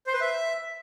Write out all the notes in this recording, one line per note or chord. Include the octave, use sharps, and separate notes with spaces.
C5
B4
E5